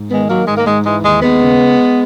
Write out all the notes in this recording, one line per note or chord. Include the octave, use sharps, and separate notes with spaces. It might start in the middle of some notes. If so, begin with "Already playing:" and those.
Already playing: G#2
D#3 G#3 B3
D#3 F#3 A#3
G#2 G#3
A#3
G#2 G#3
E3 G#3
D#2 G#3
D#2 G#3 B3
C#3